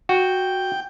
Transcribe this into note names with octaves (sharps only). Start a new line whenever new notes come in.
F#4 G5